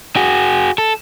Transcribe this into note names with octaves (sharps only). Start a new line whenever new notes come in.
F#4 G#4
A4